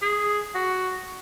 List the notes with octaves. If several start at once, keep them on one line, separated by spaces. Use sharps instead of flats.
G#4
F#4